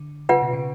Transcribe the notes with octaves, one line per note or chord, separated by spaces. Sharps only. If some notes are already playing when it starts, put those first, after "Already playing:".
Already playing: D3
C#3 F4 B4 F#5
B2
C#3